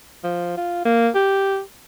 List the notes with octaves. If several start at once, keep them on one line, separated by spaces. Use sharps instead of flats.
F3
F4
A#3
G4